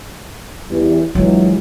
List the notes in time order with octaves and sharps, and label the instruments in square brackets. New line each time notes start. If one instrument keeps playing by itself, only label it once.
[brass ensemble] E2 E3 G3
[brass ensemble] A#1 E3 F#3 [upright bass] G#3